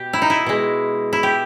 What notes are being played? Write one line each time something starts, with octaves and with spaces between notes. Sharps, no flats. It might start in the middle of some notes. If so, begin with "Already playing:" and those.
Already playing: B2 G4
E4
D#4
E4
B2 G#3
E4
G4